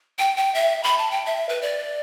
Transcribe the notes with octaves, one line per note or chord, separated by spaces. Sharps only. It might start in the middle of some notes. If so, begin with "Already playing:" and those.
G5
G5
E5
B5
A5
G5
E5
B4
D5